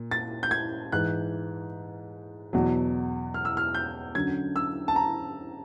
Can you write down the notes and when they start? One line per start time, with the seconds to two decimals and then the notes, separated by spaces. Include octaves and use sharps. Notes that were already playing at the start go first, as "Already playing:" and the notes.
Already playing: A#2
0.11 A6
0.43 G6
0.51 G#6
0.92 G#2 E3 F#6
2.53 E2 B2 F#3
3.34 F6
3.45 E6
3.57 F6
3.74 G6
4.15 F#2 D3 F#3 G#6
4.56 E6
4.88 A5
4.96 A#5